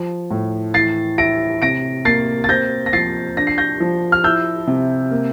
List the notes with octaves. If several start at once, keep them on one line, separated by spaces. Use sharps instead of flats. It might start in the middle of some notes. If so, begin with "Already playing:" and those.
Already playing: F3
A2
E3 A6 C7
E4 A#6 D7
C3 A#6 D7
A#3 A6 C7
A6
C4 G6 A#6
A#6
F3 A6 C7
D4 A#6
C7
G6 A#6
F3
F6
E4 E6 G6
C3
A#3